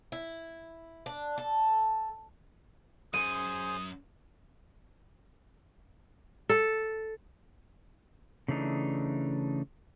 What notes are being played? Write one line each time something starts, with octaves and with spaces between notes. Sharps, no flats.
E4
D4
A4
F#2 G#4 C5 D#6 D#7
A4
C#3 E3 A3 D4 D#4